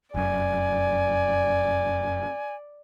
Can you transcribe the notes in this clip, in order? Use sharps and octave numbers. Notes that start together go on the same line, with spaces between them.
F1 F#2 D5 G#5